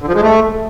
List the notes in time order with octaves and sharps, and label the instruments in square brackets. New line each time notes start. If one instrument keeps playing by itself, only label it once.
[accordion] D3
F3
G#3
A3